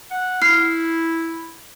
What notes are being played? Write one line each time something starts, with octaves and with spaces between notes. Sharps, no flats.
F#5
E4 F6 C7